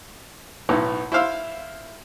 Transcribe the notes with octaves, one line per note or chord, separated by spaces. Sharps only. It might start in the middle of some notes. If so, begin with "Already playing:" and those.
B1 A2 B3
E4 C5 F5 E6